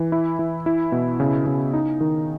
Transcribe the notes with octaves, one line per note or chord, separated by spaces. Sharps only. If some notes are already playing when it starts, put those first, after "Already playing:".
Already playing: E3
E4
E3
E4
B2
C#3
C#3
D#4
D#3